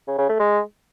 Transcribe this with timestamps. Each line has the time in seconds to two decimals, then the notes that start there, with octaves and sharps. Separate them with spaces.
0.08 C#3
0.18 C#3
0.29 A3
0.40 G#3